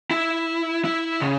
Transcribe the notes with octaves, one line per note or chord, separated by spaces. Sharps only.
E4
E4
C#3